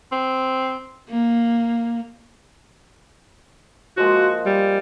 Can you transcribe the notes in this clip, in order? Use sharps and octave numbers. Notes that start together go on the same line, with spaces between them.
C4
A#3
F3 G#3 A#3 F#4
G3